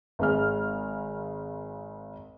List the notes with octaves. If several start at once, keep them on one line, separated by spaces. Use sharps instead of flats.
G#1 G#3 F6